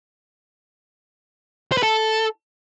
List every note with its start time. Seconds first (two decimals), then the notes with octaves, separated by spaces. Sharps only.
1.72 C5
1.77 B4
1.83 A4